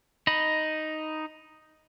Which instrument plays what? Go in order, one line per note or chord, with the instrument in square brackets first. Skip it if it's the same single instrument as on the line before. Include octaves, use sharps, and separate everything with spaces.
[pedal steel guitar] D#4 D#5 B5